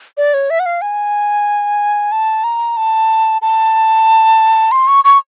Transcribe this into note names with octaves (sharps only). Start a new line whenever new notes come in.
D5
C#5
E5
F#5
F5
G#5
A5
A#5
A5
A5
C6
C#6
C#6